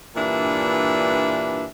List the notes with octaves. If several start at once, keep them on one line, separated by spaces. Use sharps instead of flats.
G2 A#2 E3 D4 B4 E5